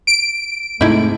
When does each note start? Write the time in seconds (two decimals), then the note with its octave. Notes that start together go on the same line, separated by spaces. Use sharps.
0.07 D7
0.81 G#2 C3 G#3 A3 D#4 E4